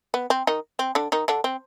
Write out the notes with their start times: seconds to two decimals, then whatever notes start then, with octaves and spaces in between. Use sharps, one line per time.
0.14 B3
0.30 C4
0.47 D#3 D#4
0.79 C4
0.95 D3 D4
1.12 D#3 D#4
1.28 D3 D4
1.44 C4